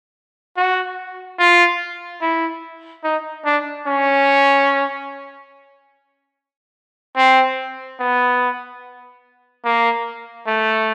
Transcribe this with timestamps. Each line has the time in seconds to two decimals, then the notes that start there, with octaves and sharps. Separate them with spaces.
0.57 F#4
1.39 F4
2.21 E4
3.04 D#4
3.45 D4
3.87 C#4
7.17 C4
8.00 B3
9.65 A#3
10.47 A3